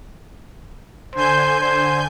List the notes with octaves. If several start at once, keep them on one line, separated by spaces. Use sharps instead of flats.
D3 C5 G#5 G6
C5